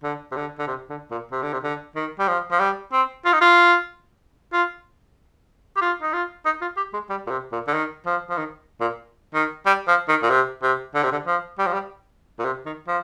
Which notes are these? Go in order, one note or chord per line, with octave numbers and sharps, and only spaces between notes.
D3
C3
D3
D3
C3
D3
A#2
C3
D3
C3
D3
D#3
G3
F3
F3
G3
C4
F4
D#4
F4
F4
G4
F4
D#4
F4
D#4
F4
G4
G#3
G3
A#2
C3
A#2
D3
D#3
F3
F3
D#3
A#2
D#3
G3
F3
D#3
A#2
C3
C3
D3
C3
D3
F3
G3
F3
G3
A#2
C3
D#3
F3